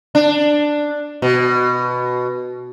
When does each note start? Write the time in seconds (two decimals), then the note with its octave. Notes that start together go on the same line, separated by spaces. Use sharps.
0.15 D4
1.22 B2